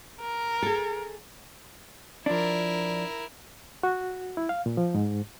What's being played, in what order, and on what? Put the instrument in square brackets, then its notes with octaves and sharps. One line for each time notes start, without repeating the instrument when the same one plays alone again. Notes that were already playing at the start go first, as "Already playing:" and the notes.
[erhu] A#4
[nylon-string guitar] G#4 A4
[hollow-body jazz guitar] F3 D4 [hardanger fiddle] E4 A#4
[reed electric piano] F#4
E4
F5
A#2
F3
G#2